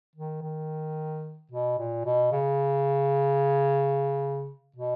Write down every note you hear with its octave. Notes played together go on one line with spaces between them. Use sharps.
D#3
D#3
B2
A#2
B2
C#3
B2